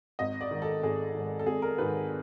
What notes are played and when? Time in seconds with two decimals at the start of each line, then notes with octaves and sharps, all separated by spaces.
0.19 G#1 D#5
0.41 D5
0.51 G#2 D#3
0.62 A4
0.83 G#1 G#4
1.14 G#2 D#3
1.39 A4
1.46 G#1 G#4
1.62 A#4
1.78 G#2 D#3 B4